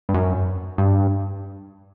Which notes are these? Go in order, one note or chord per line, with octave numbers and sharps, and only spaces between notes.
G2
F#2
G2